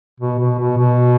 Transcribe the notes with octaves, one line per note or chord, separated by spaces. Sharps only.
B2
B2
B2
B2